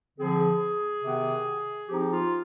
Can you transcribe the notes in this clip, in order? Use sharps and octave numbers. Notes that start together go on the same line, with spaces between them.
D3 F3 C4 G#4
C3 D#3 B3
F3 C4 D#4 G4
F4